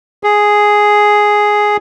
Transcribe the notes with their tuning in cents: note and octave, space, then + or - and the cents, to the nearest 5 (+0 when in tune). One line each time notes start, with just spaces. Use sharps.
G#4 +0